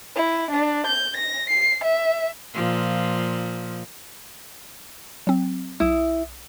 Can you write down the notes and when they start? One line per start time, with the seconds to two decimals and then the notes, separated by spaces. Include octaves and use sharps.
0.15 E4
0.51 D4
0.86 G6
1.17 A#6
1.49 C7
1.84 E5
2.54 A#2 F3
5.27 F#3 C4
5.80 B1 E4 D#6